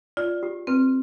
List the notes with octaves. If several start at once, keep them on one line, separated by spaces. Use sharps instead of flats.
F4 D5
G4
C4 B4